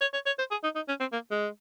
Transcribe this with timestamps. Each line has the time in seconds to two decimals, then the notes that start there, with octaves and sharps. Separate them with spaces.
0.01 C#5
0.13 C#5
0.26 C#5
0.39 C5
0.51 G#4
0.64 D#4
0.75 D#4
0.88 C#4
1.00 C4
1.13 A#3
1.31 G#3